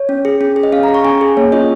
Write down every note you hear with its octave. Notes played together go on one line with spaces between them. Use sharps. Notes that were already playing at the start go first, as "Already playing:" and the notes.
Already playing: C#5
C#4
G#4
C#4
G#4
D#5
C#4 F5
A#5
G#4
C#6
C#4 G#5
G#4
A#3 C#5
C#4 F4 G#4 D#5